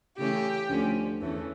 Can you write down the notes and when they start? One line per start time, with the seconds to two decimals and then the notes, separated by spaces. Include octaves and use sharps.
0.17 C#3 E3 A3 C#4 G4
0.69 D2 D3 F3 C#4
1.21 E2 E3 A3 C#4